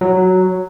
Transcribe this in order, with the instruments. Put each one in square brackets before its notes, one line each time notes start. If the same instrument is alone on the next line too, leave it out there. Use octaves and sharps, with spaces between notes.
[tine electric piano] F#3